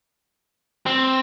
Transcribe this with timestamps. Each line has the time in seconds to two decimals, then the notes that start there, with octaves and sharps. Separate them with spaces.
0.86 C4